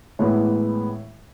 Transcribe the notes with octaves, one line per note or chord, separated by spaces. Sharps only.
A2 E3 G#3 B3 C#5 E5